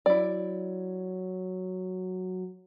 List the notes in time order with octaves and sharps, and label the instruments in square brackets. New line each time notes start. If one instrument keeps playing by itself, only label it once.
[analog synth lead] F#3 [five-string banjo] E4 D5